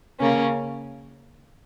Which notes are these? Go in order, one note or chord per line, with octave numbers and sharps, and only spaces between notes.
C#3 A#3 C#4